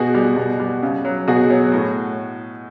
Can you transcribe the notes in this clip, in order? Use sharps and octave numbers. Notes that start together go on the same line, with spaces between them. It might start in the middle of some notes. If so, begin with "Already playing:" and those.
Already playing: B2 F#4 G#4
G3
B2
G3
C#3
F#3
B2 F#4 G#4
F#3
A2